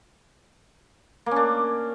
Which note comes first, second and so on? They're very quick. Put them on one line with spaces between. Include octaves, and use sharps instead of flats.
A#3 C#4 D4